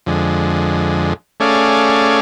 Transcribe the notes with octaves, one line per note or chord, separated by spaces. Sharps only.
F2 D3 G#3
A3 C#4 G#4 D5 F5